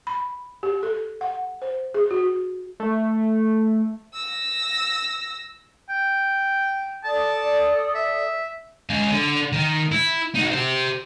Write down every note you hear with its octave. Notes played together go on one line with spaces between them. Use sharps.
B5
G4
A4
F#5
C5
G#4
F#4
A3
E6 A#6
G5
A4 D5 A5 D#6
E5
G#3 F5
D3
D#3
E4
D#4 F#4
G4 C5